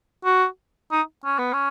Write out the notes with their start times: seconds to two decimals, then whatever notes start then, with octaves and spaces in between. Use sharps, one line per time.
0.25 F#4
0.91 D#4
1.25 C#4
1.38 B3
1.53 C#4